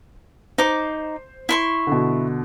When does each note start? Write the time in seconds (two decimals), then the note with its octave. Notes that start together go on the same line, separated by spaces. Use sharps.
0.58 D#4 C5 D6
1.49 E4 C6 C#6
1.87 B2 D3